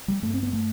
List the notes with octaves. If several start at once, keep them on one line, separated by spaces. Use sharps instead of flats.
G3
G2 A3
C4
B3
A3